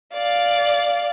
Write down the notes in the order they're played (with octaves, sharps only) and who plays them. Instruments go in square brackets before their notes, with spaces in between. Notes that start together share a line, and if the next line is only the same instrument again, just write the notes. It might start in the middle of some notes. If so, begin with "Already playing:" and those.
[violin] D5 F5